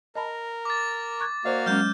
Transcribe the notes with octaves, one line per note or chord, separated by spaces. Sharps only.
A#4 D#5 A5 B5
D6 A6
C#6 F#6 G#6
A#3 F#4 C5 D5 D#5 F5
F#3 G#3 C#4 F6 G6